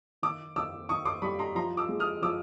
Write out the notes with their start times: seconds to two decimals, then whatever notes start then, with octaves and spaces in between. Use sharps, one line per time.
0.22 D#3 D6 E6
0.56 D#3 D6 E6
0.89 D#3 C#6 D#6
1.05 C6 D6
1.22 G3 B5 C#6
1.39 A#5 C6
1.55 F3 A#5 C6
1.77 D6 E6
1.89 G#3
2.00 D#6 F6
2.22 F3 D6 E6